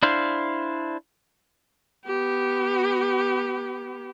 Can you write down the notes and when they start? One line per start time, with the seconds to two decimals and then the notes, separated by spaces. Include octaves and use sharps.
0.03 D4 E4 C5 F5
2.05 B3 G4